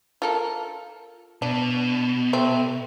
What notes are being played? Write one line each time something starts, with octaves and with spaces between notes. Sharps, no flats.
F4 A4 A#4
B2 D4
A3 C4